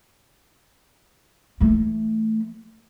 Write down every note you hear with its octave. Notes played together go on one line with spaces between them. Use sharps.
E3 A3